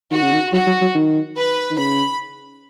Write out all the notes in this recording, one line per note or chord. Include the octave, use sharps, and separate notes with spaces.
D#3 F#4
C#3
D#3
F#3 F#4
F#3
F#3
D#3
B4
D#3
C#3 B5